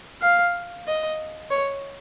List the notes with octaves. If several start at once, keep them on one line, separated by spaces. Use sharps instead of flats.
F5
D#5
C#5